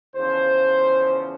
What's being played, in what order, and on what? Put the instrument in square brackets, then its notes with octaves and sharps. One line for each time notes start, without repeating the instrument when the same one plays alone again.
[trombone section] E2 C#3 F3 C5